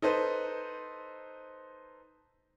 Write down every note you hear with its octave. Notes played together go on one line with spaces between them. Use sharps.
D#4 A4 B4 C5